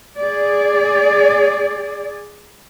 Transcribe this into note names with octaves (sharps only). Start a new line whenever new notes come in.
G#4 D5